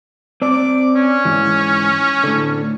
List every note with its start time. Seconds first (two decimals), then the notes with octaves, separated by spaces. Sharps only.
0.42 C4 D5 D6
0.95 C#4
1.25 G#2 E3
2.24 A2 D3